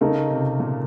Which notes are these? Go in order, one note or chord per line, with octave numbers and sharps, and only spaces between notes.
C#3 A3 D#4 A#4 D#5
C3
A#2